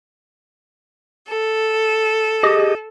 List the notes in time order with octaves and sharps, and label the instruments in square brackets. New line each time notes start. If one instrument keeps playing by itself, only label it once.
[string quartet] A4
[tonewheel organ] G4 G#4 D#5